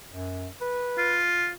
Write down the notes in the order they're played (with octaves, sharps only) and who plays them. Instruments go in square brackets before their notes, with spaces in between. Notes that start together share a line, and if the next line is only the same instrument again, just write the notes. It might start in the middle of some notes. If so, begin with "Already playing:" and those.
[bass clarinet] F#2
B4
[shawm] F4